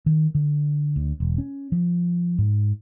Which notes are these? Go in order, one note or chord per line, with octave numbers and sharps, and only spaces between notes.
D#3
D3
D2
E1
C#4
F3
G#2